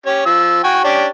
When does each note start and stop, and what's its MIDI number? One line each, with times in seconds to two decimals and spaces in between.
0.06 0.23 61
0.06 0.23 67
0.06 0.23 73
0.26 0.60 53
0.26 0.60 88
0.64 0.84 66
0.64 0.84 79
0.64 0.84 80
0.84 1.06 61
0.84 1.06 62
0.84 1.06 67